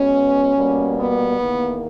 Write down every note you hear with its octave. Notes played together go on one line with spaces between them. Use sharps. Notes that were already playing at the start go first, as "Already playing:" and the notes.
Already playing: B2 G#3 B3 C#4
B2 G3 A#3
B3
E2 D#3 A#3